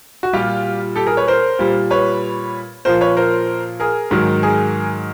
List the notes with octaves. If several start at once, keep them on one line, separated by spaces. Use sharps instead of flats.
F#4
A#2 G3 F4 G4
G4 A4
G#4 A#4
B4 C#5
A#4 C5
A#2 G3
B4 C#5
A#2 F3 A#4 C5
B4 C#5
A#4 C5
G#4 A#4
G#2 D#3 F#3
G#4 A#4